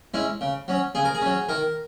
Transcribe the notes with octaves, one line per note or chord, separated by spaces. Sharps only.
G#3 C#4 E4
C#3
F#3 C#4
C#3 G#4
A#4
G#4
F#3 C#4
D#3 A#4